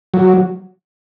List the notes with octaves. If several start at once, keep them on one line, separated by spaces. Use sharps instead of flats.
F#3